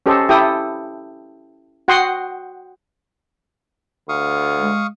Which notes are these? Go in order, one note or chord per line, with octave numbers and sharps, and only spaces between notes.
C#4 G4 A4 C5 D#5
E4 G4 A4 G5 D#6
F#4 F#5 G5 C6 D#6
D2 F5 C#6 D#6
G#3